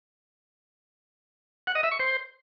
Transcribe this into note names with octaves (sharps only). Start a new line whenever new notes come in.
F#5
D#5
E5
C#6
C5